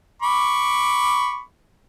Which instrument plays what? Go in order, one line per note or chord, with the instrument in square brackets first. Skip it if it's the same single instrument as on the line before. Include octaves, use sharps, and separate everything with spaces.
[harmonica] B5 C#6 D6